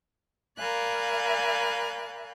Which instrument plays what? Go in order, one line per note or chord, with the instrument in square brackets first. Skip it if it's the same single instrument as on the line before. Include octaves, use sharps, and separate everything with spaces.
[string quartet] A#4 D5 F5 G#5 B5 F#6